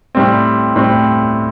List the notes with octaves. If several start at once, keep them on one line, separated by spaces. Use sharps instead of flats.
A2 G3 C4
A2 G3 C4